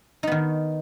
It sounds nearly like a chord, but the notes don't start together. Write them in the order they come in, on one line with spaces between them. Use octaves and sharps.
D#4 B3 D#3